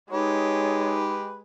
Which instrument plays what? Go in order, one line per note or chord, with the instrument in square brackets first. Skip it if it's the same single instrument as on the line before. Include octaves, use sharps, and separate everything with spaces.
[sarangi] G#3 [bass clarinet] D#4 [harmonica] G4 B4 [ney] C#5